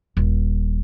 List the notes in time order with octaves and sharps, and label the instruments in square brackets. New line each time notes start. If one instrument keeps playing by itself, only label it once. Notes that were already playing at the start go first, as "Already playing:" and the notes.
[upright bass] D#1